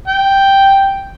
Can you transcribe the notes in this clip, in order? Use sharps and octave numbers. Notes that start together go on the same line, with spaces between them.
G5